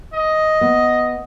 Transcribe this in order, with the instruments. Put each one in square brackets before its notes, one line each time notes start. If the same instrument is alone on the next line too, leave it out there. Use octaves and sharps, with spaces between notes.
[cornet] D#5
[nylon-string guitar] B3